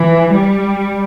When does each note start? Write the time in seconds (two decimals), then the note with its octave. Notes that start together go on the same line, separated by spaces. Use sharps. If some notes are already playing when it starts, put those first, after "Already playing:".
Already playing: E3
0.32 G3